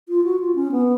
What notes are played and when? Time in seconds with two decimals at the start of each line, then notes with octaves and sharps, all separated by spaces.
0.09 F4
0.24 F#4
0.40 F4
0.55 C#4
0.72 B3